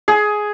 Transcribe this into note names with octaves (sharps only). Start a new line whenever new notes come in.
G#4